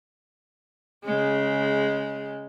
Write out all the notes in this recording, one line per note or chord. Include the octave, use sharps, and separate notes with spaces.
C#3 G#3